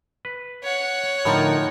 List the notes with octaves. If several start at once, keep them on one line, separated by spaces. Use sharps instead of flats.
B4
C#5 F#5
A2 D3 F3 D#4 A#4